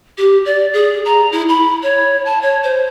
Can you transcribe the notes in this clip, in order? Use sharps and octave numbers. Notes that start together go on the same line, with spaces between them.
G4
D5
G#4
A#5
E4
B5
C#5
A5
C#5
C5